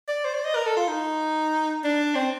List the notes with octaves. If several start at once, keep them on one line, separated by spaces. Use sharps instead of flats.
D5
C5
D5
D#5
A#4
A4
F4
D#4
D4
C4